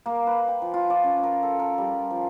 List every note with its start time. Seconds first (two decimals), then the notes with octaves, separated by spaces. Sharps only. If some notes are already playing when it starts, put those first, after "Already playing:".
0.06 A#3
0.27 B4
0.48 G5
0.62 F3
0.74 F4
0.90 D5
1.04 C#4
1.23 A#4
1.43 A4
1.59 A#4
1.78 G3
2.11 F3